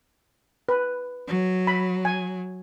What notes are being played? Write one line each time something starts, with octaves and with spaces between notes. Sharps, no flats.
B4
F#3
B5
G#5